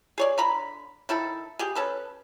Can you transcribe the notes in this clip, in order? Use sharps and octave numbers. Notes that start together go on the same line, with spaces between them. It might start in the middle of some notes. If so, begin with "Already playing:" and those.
G#4 C#5 D5
D3 A#5 B5
D#3 E4 A4
G4 G#4
C#4 A4 B4